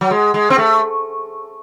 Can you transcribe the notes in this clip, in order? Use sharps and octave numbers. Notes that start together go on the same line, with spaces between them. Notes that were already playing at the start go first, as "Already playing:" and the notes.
F#3
G#3
G#3
C4
A3